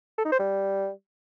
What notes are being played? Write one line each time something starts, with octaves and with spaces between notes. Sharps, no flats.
A4
D#4
C5
G3